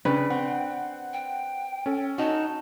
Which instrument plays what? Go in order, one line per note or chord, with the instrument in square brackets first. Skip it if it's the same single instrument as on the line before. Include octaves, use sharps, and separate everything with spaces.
[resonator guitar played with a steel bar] C#3 [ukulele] D4 B4 [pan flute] G5
[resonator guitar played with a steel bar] C4 [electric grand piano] F#5
[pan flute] G5
[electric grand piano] C#4 A4
[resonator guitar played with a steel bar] D#4 F#4 [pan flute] A5